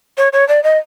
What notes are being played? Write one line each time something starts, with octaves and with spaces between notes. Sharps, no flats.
C#5
C#5
D5
D#5